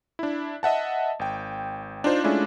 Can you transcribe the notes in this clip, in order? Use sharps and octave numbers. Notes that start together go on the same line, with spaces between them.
D4 E4
D#5 E5 F#5 A5
G#1 G5
D4 D#4 F4 C5
G#3 A3 C#4 D4 E4 F4